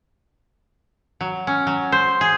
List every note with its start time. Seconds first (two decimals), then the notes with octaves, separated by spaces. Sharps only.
1.21 F#3
1.47 C#4
1.67 F#3
1.92 C5
2.21 G#4